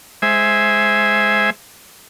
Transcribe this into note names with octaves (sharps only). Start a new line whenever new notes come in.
G#3 C5 E5 G#5